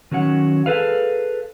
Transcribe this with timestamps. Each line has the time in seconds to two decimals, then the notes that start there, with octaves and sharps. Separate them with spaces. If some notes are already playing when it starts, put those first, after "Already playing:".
0.11 D#3 F#3 C#4 F#5
0.66 G#4 A4 B4 F5